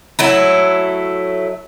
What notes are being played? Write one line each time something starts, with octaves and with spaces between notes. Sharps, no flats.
F#3 A3 E4